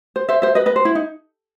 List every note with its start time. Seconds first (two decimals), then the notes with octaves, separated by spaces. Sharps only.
0.16 C5
0.29 C5 E5
0.42 C5 E5
0.55 B4 D#5
0.66 B4 D#5
0.76 C5
0.85 E4
0.95 D#4